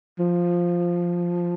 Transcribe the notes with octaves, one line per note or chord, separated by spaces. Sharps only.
F3